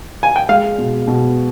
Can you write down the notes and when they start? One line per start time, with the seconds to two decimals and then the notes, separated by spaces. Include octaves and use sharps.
0.23 G#5
0.36 G5
0.49 G#3 F5
0.78 B2
1.07 B2